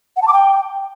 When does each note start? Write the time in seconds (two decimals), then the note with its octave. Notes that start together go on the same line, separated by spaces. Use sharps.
0.17 F#5
0.22 A5
0.28 D6
0.33 G5